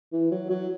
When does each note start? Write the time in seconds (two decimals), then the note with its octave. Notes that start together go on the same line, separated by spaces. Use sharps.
0.13 E3
0.31 F#3
0.50 F#3